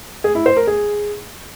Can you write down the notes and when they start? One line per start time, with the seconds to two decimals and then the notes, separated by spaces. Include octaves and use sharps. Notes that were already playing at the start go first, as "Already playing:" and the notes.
0.24 G#4
0.35 E4
0.46 C5
0.57 A#4
0.67 G#4